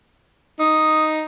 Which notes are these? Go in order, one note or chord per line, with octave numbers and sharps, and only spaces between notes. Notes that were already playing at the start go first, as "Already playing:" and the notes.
D#4 D#6